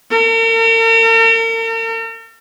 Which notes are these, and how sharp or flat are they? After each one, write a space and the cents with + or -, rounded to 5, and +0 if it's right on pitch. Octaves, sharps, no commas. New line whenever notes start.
A#4 -45